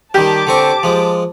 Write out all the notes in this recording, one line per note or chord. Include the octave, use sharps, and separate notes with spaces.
D#3 G3 G4 A5 D6
D3 C4 C#6
F3 G#3